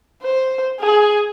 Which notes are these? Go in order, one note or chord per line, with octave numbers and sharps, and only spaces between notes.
C5
G#4